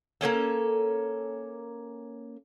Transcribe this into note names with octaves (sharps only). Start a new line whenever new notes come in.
A#3 B3 C#4 A4